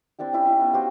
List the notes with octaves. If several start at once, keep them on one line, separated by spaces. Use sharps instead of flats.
C4 D4 E4 G4
C#4 E4 G4
D#4 E4 E5
B3 C#4 D#4
F#4 G4 C5 F5